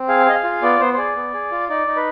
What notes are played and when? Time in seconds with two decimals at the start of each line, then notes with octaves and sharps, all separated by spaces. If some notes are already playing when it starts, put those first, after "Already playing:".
Already playing: C4
0.08 G#4 F5
0.26 G#4 D#5
0.35 F5
0.44 F4
0.62 B3 D5
0.80 B3 C5
0.94 C5
0.97 G#4 D5
1.16 B3
1.34 G#4
1.51 F4
1.69 D#4 D5
1.87 D#4
1.96 B4